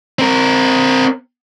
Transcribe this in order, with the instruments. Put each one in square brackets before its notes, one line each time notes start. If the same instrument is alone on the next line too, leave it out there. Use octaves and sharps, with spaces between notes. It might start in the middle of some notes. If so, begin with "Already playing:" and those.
[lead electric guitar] C4 A#4